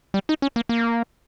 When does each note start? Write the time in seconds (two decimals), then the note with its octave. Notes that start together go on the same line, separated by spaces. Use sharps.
0.14 G3
0.29 D#4
0.42 C#4
0.56 A#3
0.69 A#3